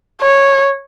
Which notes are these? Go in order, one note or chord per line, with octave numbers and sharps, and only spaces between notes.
C#5